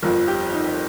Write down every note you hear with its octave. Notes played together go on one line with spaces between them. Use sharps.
G1 F2 F3 A#4
G4
D#4